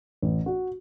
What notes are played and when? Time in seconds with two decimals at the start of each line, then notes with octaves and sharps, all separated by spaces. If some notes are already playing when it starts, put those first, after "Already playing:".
0.22 A1
0.46 F#4